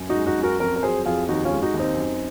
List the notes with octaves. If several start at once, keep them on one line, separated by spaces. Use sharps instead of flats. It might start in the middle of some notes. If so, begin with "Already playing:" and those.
Already playing: F#2
D#4 F#4
G#3
D#4 F#4
F#2
F#4 A#4
F2 F#4 A#4
A#4
F#3 G#4 C5
F2 F4 G#4
D#2 D#4 F#4
C#4 F4
G#3
D#4 F#4
D#2
C4 D#4
F#2